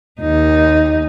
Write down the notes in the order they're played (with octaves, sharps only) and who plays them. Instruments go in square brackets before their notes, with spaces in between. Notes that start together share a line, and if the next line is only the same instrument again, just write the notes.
[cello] D#2 D#4